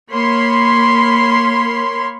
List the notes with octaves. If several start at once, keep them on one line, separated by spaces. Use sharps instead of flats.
A#3 C#5 B5 C6